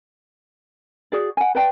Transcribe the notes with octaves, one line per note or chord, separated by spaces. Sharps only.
F#4 G#4 D5
F#5 G#5
B4 D5 G5 A5